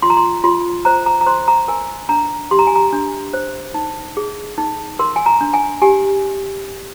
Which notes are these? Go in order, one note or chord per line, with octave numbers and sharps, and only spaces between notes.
F4 C6
A#5
C6
F4 C6
C5 A#5
A#5
A#5
C5 C6
A#5
A#4 G#5
D4 A#5
G4 C6
A#5
G#5
A#5
D4
C5
D#4
G#4
D#4
A#4 C6
G#5
A#5
D4
G#5
G4 G#5